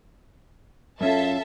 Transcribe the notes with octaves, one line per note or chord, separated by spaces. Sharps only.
F#2 C#4 F4 A4 E5 A5